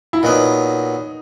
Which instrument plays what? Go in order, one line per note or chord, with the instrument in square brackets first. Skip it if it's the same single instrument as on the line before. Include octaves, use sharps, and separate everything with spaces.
[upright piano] E4
[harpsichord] A#2 F#3 B3 [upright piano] D#4